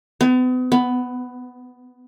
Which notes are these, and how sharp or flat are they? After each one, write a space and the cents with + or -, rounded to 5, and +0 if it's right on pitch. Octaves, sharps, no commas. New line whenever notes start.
B3 +40
B3 +10